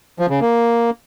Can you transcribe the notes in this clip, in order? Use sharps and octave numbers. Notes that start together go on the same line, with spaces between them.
F3
C#3
A#3